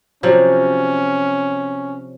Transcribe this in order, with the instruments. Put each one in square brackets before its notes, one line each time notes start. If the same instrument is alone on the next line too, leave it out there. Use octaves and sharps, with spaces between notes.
[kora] C3 F3 F#3 [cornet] C#4